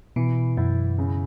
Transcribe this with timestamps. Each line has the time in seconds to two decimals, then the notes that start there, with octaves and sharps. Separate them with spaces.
0.16 B2 E3
0.57 F#2 E4
0.98 C#3